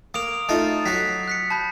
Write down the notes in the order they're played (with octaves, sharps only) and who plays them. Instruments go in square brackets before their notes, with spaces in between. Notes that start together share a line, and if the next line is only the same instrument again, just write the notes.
[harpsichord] A#3 [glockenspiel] D#6 D7 F7
[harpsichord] A3 D#4 F4 [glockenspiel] A5 A6
[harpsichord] F#3 F#4 [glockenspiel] B6 C7
[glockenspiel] F#6 B6 C#7
A5 B5 G6